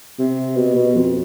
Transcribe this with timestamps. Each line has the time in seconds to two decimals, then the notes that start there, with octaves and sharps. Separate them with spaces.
0.19 C3
0.56 B2
0.76 B2
0.95 F2